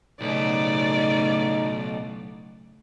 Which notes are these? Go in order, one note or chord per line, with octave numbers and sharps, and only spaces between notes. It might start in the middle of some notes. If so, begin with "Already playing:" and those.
B1 A2 C#3 D#4 D5